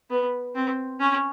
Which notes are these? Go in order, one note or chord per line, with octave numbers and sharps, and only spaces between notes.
B3
C4
C#4